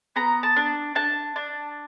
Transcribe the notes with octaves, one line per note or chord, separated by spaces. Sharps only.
B3 A#5
A5
D4
D4 A5
D4